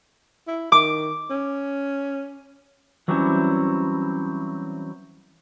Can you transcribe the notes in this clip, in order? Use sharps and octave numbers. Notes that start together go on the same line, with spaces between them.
E4
D#3 D6
C#4
E3 F#3 G3 C4 C#4 E4